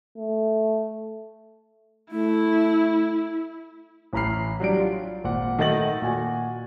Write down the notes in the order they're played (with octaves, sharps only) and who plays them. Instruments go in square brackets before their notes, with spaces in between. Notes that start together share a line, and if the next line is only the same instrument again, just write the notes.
[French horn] A3
[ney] A3 [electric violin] E4
[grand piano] A1 E3 A#5 B5 F6 C7
F#3 G3 D4 D7
F4
G#1 A#2 F#5
D#3 A3 F#4 D#5 A6 F#7
A#2 F#4 G#5